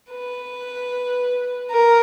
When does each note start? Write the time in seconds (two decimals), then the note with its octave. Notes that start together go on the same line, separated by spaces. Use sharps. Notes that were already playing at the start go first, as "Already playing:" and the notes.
0.11 B4
1.72 A#4